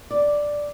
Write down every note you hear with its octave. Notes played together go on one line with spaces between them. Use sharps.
D5